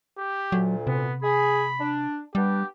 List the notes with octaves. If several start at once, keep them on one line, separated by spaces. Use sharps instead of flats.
G4
D2 A#2 F#3
C3 B3
G#4 B5
D4
G3 B3 D4 G4